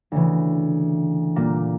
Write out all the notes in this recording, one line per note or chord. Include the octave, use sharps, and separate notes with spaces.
D2 C#3 E3
A#2 G3 A#3